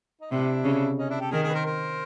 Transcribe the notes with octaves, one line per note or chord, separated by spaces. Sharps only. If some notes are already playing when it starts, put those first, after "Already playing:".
D#4
C3 D4 E4
C#3
C#4 D#4
D4 E4
G4 A4
D#3 G#4 A#4
G#4 A#4
B4
A#4 C5
A#4 C5